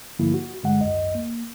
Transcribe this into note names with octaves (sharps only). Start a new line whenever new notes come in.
G2 D3 F3 A#3 E4
F#4
G2 D3 G#3 F#5
G#1 C#2 F#2 D#5
A#3